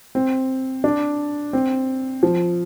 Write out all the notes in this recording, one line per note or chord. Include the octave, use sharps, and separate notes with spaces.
C4
D4
C4
F3